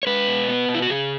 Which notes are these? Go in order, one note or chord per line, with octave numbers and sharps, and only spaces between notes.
C#5
G#3 B4
B2
B3
B2
E4
F#4
C#3 G#4